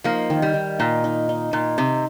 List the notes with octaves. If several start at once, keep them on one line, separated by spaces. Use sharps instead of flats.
F3 A#3 D#4
D#3
G3
D#3
A#2 D#4
D#4
D#4
A#2 D#4
C3 D#4